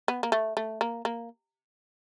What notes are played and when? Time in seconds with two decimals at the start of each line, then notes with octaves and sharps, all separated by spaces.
0.08 B3
0.23 A#3
0.32 A3
0.57 A3
0.81 A#3
1.05 A#3